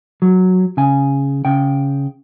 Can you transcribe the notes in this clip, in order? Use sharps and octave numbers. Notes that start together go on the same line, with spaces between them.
F#3
C#3 G#5
C#3 G5